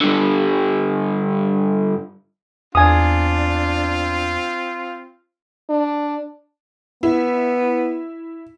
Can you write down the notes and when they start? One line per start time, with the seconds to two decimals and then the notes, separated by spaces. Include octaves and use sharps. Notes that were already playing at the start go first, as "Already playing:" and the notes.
0.01 G2 D3
2.75 E2 C4 D4 F4 G#5 D#6
5.70 D4
7.03 B3 E4